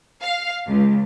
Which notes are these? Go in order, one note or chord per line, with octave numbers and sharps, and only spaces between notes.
F5
C#2